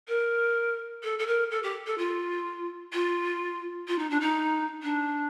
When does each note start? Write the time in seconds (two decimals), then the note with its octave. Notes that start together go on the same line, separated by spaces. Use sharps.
0.08 A#4
1.03 A4
1.19 A4
1.27 A#4
1.51 A4
1.63 G4
1.86 A4
1.98 F4
2.93 F4
3.88 F4
3.98 D#4
4.10 D4
4.20 D#4
4.83 D4